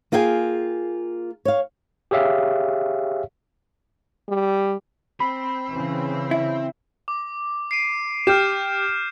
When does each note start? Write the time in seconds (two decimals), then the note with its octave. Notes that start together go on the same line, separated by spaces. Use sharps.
0.12 A#3 F4 G#4 G5 G#5
1.45 C#5 F5
2.11 G4 G#4 C#5 E5 F5
4.29 G3
5.20 C4 B5
5.71 C#3 E3
6.31 E4
7.08 D6
7.71 C7 D7 D#7
8.27 G4 F6 G6 E7